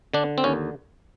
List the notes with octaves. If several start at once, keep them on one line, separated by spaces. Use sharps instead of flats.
D3 D4
C4
D#2 C#4